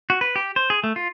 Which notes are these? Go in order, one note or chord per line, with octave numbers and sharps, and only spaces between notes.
F#4
B4
G4
C5
G#4
A3
F4